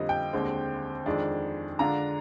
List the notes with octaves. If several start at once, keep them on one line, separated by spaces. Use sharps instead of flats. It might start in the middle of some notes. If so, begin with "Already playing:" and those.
Already playing: F2 D3 G3 A#3 D#5
G5
D#2 D3 G#3 C4
F2 D#3 G#3 D4
D3 G#3 D4 F4 A#5